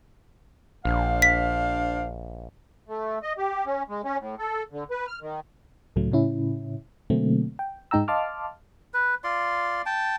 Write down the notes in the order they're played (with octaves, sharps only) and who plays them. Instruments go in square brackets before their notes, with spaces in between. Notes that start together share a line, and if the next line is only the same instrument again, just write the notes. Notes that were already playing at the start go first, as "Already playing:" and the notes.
[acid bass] A#1 [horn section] D4 C5 F5
[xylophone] B6
[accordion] A3
D#5
G4
C#4
G#3
C#4
A2
A4
D3
B4
F6
D#3
[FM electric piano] C#2 A2 C#3 F#3 A3
A2 C#3 C#4 E4
B2 D3 F#3 A3 A#3 C4
G5
G#2 G#3 D#4 G5 A#5 E6
D#5 F5 A5 C6 D6 F6
[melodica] B4
F4 D5 C6
G5 A5